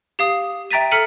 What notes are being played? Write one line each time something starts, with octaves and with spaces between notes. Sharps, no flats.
G4 F5 D#6
E5 G5 A#5 A6 B6 D#7
A4 A#5 F6 B6 C#7 D#7